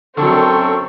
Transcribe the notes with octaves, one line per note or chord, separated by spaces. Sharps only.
F#2 D3 F#3 C4 A4 C#6